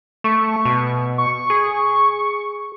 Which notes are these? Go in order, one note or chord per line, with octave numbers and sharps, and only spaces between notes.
A3 C#6
B2
C#6
G#4